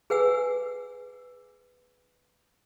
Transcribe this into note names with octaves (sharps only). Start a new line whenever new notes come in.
G#4 B4 F#5 G#5 E6